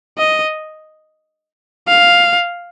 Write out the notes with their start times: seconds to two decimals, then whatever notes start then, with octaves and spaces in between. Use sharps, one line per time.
0.18 D#5
1.88 F5